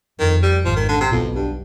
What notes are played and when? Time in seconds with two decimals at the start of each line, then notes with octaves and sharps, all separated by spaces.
0.19 F2 D#3
0.43 G3
0.65 G#1 G#2 F3
0.76 D#3
0.89 D3
1.00 C3
1.11 B1 F2 B2
1.35 G2